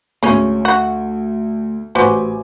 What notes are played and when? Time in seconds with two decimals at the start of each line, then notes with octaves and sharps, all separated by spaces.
0.23 D2 G#3 C#4
0.65 F#4
1.95 A1 F#4 B4 C5 G#5 D6